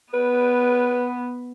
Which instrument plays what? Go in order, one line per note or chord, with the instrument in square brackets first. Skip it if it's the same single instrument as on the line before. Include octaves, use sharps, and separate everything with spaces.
[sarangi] B3 [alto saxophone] B4